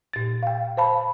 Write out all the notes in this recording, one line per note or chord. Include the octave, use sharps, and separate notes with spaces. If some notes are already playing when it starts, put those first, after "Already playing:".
A#2 A6
F5 G5
C5 F5 A5 B5